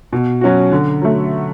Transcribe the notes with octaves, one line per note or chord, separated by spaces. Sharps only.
B2
F#3 C#4 F#4
D3
F#3 A3